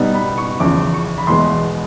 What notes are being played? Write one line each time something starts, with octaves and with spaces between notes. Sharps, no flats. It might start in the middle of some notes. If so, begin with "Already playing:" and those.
Already playing: B2 G3 B3 D#4
B5
C#6
E2 C#3 F3 D6
C#6
B5
E2 B2 G#3 B3 C6